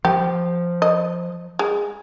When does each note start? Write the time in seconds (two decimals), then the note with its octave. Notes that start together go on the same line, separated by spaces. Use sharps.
0.05 F3 G4
0.82 D#5
1.59 G#3